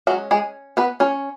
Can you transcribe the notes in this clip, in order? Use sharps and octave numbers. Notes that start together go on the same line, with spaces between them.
F#3 G#3 C#4 F#4
G#3 G#4
B3 B4
C#4 C#5